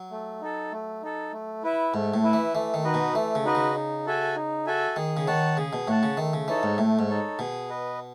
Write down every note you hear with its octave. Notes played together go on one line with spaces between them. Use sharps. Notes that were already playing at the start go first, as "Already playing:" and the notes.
Already playing: F#3
A3
D#4 A4
A3
D#4 A4
A3
E4 B4 E5
G#2 A3
A2
E4 B4 E5
E3
E3 A3
D#3
D#4 F#4 B4 D#5
B2
E3 A3
C#3
D#4 F#4 B4 D#5
C#3
D#4
F#4 A4 E5 G#5
D#4
F#4 A4 E5 G#5
D#3 G#4
C#3
D#3 C#5 F#5 A5
C#3 G#4
B2
A2 C#5 F#5 A5
C#3
D#3 A3
C#3
E3 D#4 A4 C#5
G#2
A2 A3
G#2
D#4 A4 C#5
B2 G#4
B4 D#5